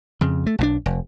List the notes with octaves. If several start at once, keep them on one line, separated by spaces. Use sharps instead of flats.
F2 C#3
A3
B1 G3 D4
F1